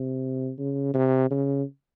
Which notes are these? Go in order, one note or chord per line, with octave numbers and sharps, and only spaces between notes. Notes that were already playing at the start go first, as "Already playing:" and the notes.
Already playing: C3
C#3
C3
C#3